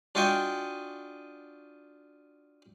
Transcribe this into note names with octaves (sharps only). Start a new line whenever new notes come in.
D4 F4 F#4 D#5 G5 G#5